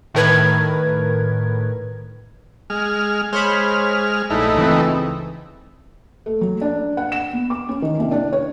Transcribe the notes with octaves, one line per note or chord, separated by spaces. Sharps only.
A2 D#3 A#4 B4 G#6
G#3 F6
G#3 C5 C#5 B5 F6
A#1 G2 A3 D#4 E4
C#2 E3 C4
A3
F#3
D4
F#5
E7
B3
D6
C#4
D#3
C2
D4
C#5